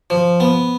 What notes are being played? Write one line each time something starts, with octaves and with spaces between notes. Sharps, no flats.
F3
B3